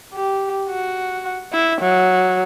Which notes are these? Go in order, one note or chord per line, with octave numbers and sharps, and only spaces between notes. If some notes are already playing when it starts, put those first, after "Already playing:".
G4
F#4
E4
F#3